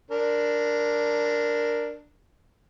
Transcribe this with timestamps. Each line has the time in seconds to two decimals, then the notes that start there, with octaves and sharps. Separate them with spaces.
0.11 D4 A#4